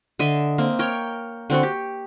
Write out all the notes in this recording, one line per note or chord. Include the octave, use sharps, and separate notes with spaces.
D3 D#5 E5
A#3 C4
A#4 C#5 G5
D3 C4 F#4 C#6
G4